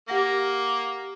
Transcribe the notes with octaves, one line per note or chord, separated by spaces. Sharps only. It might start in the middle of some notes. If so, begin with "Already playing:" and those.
A#3 G4 F#5 A#6